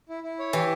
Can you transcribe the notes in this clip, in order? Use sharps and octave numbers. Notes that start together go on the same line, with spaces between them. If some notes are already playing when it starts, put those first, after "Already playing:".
E4
E4
C#5
E3 G4